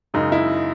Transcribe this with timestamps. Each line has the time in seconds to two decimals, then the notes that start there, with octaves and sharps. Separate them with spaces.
0.14 F#2 C#3 G#3 D#4
0.32 E4